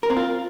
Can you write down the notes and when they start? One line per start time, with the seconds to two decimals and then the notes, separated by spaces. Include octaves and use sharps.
0.03 A#4
0.10 C4
0.17 F4